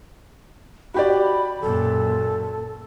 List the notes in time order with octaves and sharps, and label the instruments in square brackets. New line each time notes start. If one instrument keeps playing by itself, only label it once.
[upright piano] F#4 G4 D5 [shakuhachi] B5
[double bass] F#2 A#2 [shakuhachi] A4